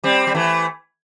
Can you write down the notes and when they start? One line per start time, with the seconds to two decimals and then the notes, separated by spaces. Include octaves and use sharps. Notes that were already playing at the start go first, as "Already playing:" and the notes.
0.04 G3 C4
0.27 G3
0.35 E3 A3